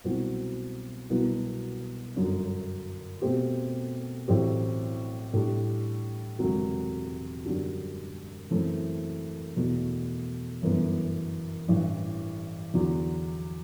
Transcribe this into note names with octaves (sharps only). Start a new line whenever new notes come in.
C2 B2 F#3 C4 F#4
C2 B2 F#3 B3
G1 F#2 D3 F#3
B2 A3 C4 G4
A1 A2 F#3 C4 G4
A2 G3 D4
E1 D2 C3 F#3
F#2 D3 G3 D4 F#4
F#2 E3 A3 C4 E4
E2 B2 A3
G1 F#2 E3 B3
A1 G2 E3
E2 D3 F#3